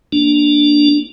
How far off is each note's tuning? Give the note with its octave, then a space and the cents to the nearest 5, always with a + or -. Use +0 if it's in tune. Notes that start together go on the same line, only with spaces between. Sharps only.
A#3 +0 D4 +0